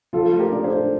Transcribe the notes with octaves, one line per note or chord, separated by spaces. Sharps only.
F3 F4 A4
A3
G4 A#4
D4 D5
A4 C5
D4